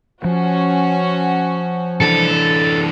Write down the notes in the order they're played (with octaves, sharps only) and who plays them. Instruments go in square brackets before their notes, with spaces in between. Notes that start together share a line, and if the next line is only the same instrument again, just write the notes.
[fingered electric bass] F3 [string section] C#4 F#4
[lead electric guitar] E3 D4 [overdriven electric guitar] A4